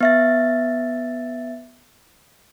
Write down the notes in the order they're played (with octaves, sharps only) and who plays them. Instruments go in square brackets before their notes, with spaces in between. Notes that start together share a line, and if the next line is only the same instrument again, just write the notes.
[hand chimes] B3 E5 A6